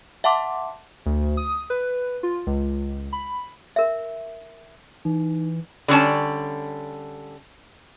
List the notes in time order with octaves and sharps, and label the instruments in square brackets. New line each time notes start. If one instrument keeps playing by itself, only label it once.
[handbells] E5 F#5 A5 C6 D6
[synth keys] D2
D#6
B4
F4
C#2
B5
[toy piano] A#4 E5
[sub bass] E3 [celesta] D#4
[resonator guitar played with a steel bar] D3 G3 C#4 A5